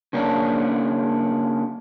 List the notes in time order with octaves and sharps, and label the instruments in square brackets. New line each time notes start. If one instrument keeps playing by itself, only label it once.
[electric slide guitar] C#3 A#3 C#4 D4